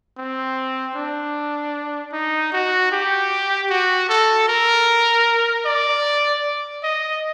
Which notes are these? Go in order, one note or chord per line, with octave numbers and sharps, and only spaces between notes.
C4
D4
D#4
F#4
G4
F#4
A4
A#4
D5
D#5